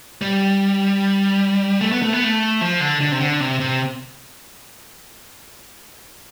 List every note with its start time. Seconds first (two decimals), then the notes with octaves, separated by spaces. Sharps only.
0.21 G3
1.81 A3
1.92 B3
2.02 A3
2.13 B3
2.24 A3
2.61 F3
2.80 D3
3.01 D3
3.12 C3
3.21 D3
3.40 C3
3.60 C3